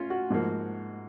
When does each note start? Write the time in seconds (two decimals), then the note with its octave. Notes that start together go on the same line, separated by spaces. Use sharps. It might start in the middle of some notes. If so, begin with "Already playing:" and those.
Already playing: C#4 F4
0.10 F#4
0.30 G#2 F3 A#3